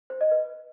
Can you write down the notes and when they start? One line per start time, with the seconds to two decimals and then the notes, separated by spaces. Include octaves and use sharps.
0.10 C5
0.21 D#5
0.31 B4